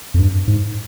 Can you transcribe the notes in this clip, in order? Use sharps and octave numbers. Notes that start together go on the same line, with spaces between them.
F2
G2
G#2